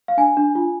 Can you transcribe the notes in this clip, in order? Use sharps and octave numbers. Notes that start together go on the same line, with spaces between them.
F5
D4 G#5
D4
F4